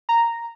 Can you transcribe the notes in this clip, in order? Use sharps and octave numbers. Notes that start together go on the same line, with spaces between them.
A#5